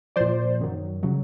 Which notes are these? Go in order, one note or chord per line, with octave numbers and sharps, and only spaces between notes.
A#2 F3 C5 D5
F#2 D#3 F#3
C#3 F#3